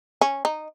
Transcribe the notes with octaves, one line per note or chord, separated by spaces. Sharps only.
C#4
D#4